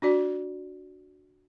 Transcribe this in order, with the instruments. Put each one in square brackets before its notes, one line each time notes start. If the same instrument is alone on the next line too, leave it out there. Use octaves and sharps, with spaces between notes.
[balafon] D4 F#4 D5